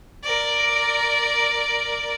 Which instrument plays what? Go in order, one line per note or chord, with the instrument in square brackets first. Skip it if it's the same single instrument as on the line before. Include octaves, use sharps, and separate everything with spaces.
[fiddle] A#4 D5